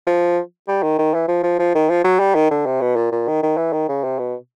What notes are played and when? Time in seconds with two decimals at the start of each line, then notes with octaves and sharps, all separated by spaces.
0.07 F3
0.68 G3
0.83 D#3
0.99 D#3
1.14 E3
1.28 F3
1.43 F3
1.59 F3
1.75 D#3
1.90 F3
2.04 F#3
2.20 G3
2.35 D#3
2.51 D3
2.66 C3
2.81 B2
2.96 A#2
3.12 A#2
3.27 D#3
3.43 D#3
3.57 E3
3.73 D#3
3.88 C#3
4.04 C3
4.19 B2